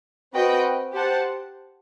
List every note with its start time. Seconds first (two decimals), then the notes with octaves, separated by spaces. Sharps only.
0.34 C4 F#4 B4 D#5 G5
0.93 G4 C5 F#5 A5